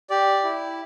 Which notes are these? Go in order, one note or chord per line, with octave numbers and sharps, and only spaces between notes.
G4 D5
E4